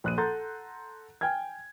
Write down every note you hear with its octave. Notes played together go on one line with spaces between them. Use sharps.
A#1 F#6 D#7
A4 F#5 A#5 C6 G6 A6
G5 G#5 F6 G#6